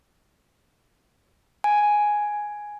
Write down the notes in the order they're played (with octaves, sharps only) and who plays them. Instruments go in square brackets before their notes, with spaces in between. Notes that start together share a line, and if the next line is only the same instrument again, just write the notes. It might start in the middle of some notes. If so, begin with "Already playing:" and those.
[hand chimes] G#5